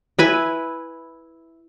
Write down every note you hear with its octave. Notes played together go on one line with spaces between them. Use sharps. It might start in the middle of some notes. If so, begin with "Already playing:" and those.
E4 B4 G#5